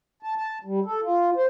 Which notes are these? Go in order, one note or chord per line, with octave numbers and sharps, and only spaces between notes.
A5
A5
G3
A4
F4
C5